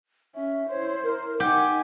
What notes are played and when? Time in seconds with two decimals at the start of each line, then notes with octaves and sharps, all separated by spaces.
0.35 C#4 E5
0.70 E4 C5 C#5
1.04 A#4
1.40 D#4 G4 F#5 G#5